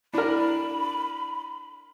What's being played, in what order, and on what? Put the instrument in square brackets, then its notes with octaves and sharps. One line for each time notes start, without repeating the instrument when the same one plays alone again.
[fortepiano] D4 A#4 [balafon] E4 [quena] B5